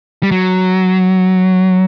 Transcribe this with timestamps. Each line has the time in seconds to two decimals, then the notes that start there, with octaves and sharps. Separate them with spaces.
0.23 G3
0.31 F#3